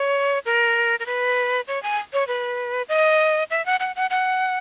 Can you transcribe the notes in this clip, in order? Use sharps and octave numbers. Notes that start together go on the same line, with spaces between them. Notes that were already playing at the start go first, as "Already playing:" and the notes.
Already playing: C#5
A#4
A#4
B4
C#5
G#5
C#5
B4
D#5
E5
F#5
F#5
F#5
F#5